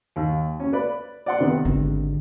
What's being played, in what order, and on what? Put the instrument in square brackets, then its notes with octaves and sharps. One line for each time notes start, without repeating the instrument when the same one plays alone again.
[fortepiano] D#2
C#4
B4 D5 B5
D5 F#5 C6
C3 D#3 B3
[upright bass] G#1 D3